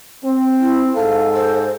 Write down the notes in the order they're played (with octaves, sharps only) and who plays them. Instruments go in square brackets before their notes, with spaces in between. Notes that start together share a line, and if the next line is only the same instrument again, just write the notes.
[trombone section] C4
[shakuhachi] E4
[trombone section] G#2 A4 [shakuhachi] F5
[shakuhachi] C5